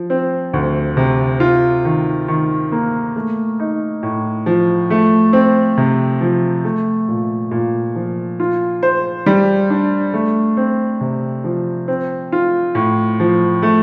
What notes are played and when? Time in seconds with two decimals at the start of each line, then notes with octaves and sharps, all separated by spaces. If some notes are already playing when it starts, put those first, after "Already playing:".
Already playing: F3
0.10 C4
0.53 D2
0.97 C3
1.40 F4
1.85 D#3
2.28 D#3
2.72 A#3
3.16 A3
3.59 D#4
4.03 A2
4.46 F3
4.90 A3
5.33 C4
5.77 C3
6.21 F3
6.64 A3
7.08 A#2
7.51 A#2
7.95 F3
8.40 F4
8.83 C5
9.26 G3
9.70 D4
10.13 A3
10.57 C4
11.01 C3
11.44 F3
11.88 C4
12.32 F4
12.75 A2
13.20 F3
13.62 A3